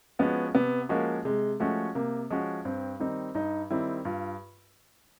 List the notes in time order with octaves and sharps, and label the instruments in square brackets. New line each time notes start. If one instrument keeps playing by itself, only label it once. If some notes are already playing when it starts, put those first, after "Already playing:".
[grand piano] F3 G#3 C#4 F#4 [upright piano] B3
[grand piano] C3 [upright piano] B3
[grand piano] F3 G#3 C#4 F#4 [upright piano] A#3
[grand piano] C3 [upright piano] G#3
[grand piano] F3 G#3 C#4 F#4 [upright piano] A3
[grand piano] C3 [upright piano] A#3
[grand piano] F3 G#3 C#4 F#4
[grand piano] G2 [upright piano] C4
[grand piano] D#3 G3 C4 D#4
[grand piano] G2 [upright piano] D#4
[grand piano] D#3 G3 C4 D#4 [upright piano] E4
[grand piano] G2 [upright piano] F4